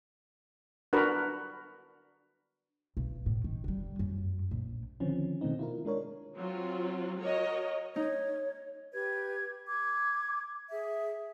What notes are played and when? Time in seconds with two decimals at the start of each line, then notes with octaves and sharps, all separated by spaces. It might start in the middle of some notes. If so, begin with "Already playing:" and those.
0.93 D4 F#4 A#4 B4
2.97 B1
3.26 A2
3.44 D#3
3.64 D3 G3
3.99 F#2
4.51 A#1
5.00 D3 D#3 F3 C4 C#4
5.41 B2 D#3 A3 C4 D#4
5.59 E4 F4 A#4
5.85 G#3 D4 A#4 C#5
6.35 F#3 C4 F4
7.19 F#4 A#4 C#5 D#5
7.96 D#4 C#5
8.93 G4 B4 G#6
9.68 D6 G#6
10.71 G#4 E5